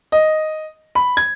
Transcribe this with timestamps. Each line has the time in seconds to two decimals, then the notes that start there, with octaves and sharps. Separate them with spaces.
0.12 D#5
0.95 B5
1.17 G#6